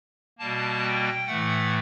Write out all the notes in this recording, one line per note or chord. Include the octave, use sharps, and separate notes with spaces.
B2 G3 A#3 A5
G5
A2 E3 A3 F#5